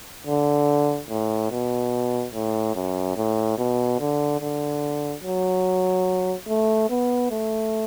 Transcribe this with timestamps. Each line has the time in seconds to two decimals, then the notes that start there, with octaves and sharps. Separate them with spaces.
0.27 D3
1.09 A2
1.51 B2
2.34 A2
2.75 F#2
3.17 A2
3.58 B2
4.00 D3
4.41 D3
5.24 F#3
6.48 A3
6.89 B3
7.31 A3